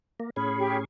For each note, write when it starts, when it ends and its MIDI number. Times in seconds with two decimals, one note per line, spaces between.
0.20 0.30 58
0.36 0.85 45
0.36 0.85 61
0.36 0.85 68
0.36 0.79 83
0.57 0.76 67